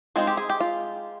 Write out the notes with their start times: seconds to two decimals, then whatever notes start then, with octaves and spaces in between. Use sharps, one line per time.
0.16 G#3 C4 D#4 F4
0.27 G4
0.37 G#4
0.50 G4
0.60 F4